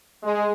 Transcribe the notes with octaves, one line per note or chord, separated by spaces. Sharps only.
G#3